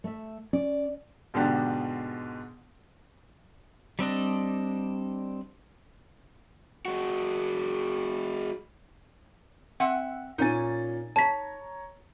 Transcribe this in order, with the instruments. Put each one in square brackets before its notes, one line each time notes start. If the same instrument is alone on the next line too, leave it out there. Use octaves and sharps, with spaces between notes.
[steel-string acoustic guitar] A3 E5
[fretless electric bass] C#4 [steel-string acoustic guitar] D5
[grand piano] G#2 B2 D3 G#3 D4 G4
[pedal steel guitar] G3 C4 D4 D#5
[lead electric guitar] G#3 F#4
[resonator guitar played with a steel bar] C4 E5 F#5
[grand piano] A#2 C#4 A6 [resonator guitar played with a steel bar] D#4 G#5
[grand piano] C#5 A#5 [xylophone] A5 B6